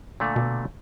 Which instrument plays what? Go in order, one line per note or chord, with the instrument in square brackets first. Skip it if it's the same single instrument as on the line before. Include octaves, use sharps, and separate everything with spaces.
[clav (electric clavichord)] A#2 D3 A3
[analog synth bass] B2